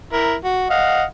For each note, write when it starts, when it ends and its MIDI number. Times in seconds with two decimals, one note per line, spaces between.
0.13 0.34 64
0.13 0.34 70
0.44 0.69 66
0.70 1.03 75
0.70 1.03 77
0.70 1.03 78